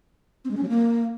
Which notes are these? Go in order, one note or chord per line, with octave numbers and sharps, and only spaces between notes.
C4
G#3
C#4
F#3
A#3